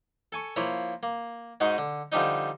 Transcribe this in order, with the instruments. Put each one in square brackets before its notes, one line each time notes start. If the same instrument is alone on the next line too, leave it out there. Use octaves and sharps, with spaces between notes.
[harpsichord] A4 G#5 C#6
F3 A#3 E4 C#5
A#3
G#2 G#3 D#4 F#4
D3
D3 F3 G3 D4 D#4